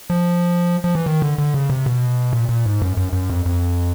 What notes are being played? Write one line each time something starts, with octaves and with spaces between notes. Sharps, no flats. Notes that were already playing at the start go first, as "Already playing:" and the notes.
F3
F3
E3
D#3
D3
D3
C#3
C3
B2
A#2
A#2
G#2
F#2
F#2
F#2
F2
F2